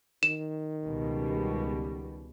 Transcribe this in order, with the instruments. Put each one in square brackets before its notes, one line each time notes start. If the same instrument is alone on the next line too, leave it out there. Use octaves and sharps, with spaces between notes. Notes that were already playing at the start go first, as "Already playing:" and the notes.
[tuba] D#3 [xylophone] E7
[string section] C#2 B2 G3